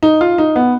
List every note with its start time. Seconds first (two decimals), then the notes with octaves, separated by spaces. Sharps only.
0.03 D#4
0.21 F4
0.38 D#4
0.56 B3